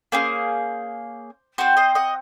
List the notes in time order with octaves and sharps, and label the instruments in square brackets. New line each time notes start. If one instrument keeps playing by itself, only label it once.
[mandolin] A#3 C#4 G#4 C5
C4 F#4 C5
C5 D#5
D#5 F#5